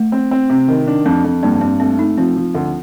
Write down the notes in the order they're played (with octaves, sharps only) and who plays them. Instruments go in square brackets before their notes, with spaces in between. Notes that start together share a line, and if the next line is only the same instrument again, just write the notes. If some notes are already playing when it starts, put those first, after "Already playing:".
Already playing: [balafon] A3
[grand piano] C4
C4
C3
D#3
D4
F2
F2
[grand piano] G2 [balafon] A#3
[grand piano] G2 [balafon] C4
[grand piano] A3 [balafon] C4
[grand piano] A3 [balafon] D#4
[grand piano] F3 [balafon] C4
[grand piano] F3
D2